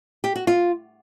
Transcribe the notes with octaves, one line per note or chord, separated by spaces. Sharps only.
G4
F#4
F4